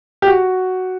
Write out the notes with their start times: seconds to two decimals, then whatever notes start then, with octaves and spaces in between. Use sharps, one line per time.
0.22 G4
0.27 F#4